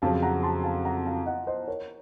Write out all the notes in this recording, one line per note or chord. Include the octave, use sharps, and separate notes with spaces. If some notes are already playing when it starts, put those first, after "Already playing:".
F2 C#3 F#3 C4 F5 A5
F#5 A#5
A5 C6
F5 A5
F#5 A#5
F5 A5
D#5 F#5
C5 D#5
A#4 C#5